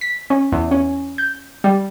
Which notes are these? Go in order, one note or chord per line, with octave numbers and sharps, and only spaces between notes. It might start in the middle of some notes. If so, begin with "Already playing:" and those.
B6
C#4
E2
C#4
G6
G3